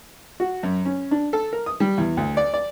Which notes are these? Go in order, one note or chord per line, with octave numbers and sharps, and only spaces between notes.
F#4
F#2
C#4
D4
A4
A#4
D#6
G3
E2
D2
D5
D5